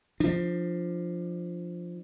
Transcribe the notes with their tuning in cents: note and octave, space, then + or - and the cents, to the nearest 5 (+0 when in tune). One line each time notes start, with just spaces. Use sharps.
F3 +0 D4 +25